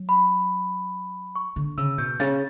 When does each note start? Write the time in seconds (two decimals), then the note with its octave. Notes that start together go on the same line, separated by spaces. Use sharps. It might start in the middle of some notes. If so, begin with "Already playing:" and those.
Already playing: F#3
0.09 B5
1.35 C#6
1.56 D3
1.77 C#3 E6
1.98 B2 G6
2.20 C#3 A6